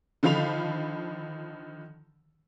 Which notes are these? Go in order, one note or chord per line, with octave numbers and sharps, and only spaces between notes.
D3 D#3 F3 F5 B5 F7